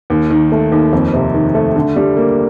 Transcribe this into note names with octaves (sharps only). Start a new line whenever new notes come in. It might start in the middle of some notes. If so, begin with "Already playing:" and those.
D#2
D#3
A3
D#2
F2
C3
D#3
A3
D3
G3
A#3